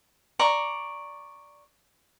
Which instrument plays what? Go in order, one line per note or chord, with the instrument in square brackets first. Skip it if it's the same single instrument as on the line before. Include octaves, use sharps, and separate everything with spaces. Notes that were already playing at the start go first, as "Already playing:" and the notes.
[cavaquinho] D5 A#5 C#6